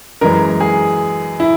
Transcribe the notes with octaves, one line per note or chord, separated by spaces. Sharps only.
F#2 E3 G#3 A#4
G#4
E4